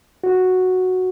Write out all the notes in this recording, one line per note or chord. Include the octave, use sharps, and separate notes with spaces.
F#4